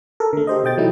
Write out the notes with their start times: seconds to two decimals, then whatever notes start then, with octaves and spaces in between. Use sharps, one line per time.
0.20 A4 A#4
0.33 D3 A3
0.47 G4 C5 D#5
0.64 B2 D#5 G5 A6
0.77 E3 F#3 A3 D#4 E4